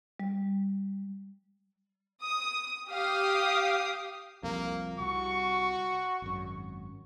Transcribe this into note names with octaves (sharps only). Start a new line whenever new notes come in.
G3
D#6
G4 F5 D#6
C2 F2 A#3
C2 F#4 C#6
G#1 F#2